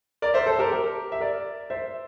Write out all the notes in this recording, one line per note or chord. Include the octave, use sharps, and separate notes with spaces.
A#4 D5
C5 E5
A4 C5
G4 A#4
G4 A#4
E5
A#4 D5
C5 E5